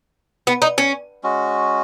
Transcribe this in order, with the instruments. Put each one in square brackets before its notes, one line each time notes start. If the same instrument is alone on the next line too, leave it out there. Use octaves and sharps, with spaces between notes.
[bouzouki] B3
D#4
C#4
[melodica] G#3 C#4 F#4